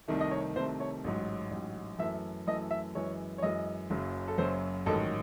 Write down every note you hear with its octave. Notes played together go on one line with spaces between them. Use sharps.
C2 C3 D#3 A3
D#5
C#5
C2 C3 D#3 A3 C5
C#5
A1 G#2 F#3
A1 G#2 F#3
F#2 E3 A3 E5
F#2 E3 A3 D#5
E5
F#2 E3 G#3 C#5
C#5
F#2 E3 G#3 D#5
F#1 F#2 C#3 F#3
A4
F#1 F#2 C#3 F#3 C5
A1 G#2 D#3 F#3 A4